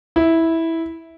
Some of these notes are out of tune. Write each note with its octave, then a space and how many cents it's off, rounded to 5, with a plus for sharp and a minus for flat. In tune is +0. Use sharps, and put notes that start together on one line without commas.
E4 -10